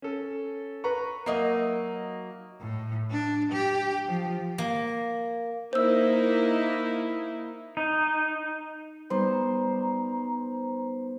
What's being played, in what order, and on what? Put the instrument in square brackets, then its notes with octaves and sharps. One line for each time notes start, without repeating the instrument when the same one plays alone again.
[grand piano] C#4 A4
B4 A#5 C#6
[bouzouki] F#3 D#4 E5 [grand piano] A#3 D#6
[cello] A2
D4
G4
F3
[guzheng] A#3
[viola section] A#3 D#4 E4 [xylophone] C5 E6
[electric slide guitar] D#4
[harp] G3 [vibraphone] B3 D#4 B4 [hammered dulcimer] C5 [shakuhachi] A#5